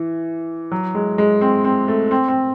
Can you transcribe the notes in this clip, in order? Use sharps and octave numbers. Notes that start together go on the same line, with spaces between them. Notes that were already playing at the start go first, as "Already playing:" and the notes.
Already playing: E3
F#3
G#3
G#3
C4
C4
A3
C4
C4